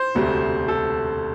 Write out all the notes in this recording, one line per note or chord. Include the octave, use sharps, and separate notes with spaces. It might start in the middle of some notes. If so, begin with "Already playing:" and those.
Already playing: C5
E1 D2 C3 A3
A4